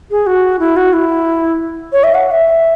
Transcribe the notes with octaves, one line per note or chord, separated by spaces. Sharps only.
G#4
F#4
E4
F#4
E4
C#5
E5
F#5
F#5
E5